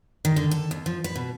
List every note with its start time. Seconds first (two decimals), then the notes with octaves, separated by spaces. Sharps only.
0.25 D#3
0.36 D3
0.51 A4
0.71 D#2
0.86 F3
1.04 B4
1.15 B2